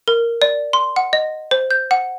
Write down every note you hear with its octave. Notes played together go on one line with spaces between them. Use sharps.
A#4
D5
C6
F#5
D#5
C5
G6
F#5